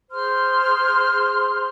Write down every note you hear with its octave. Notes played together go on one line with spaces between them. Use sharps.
G#4 C5 C6 F6